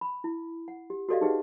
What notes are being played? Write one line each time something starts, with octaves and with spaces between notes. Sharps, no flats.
B5
E4
F#5
G4
F#4 G4 A4 D5 D#5 F5
D#4 G4 G#4 B4 D#5 F#5